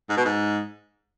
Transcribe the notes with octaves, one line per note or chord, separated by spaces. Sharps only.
G#2
B2
G#2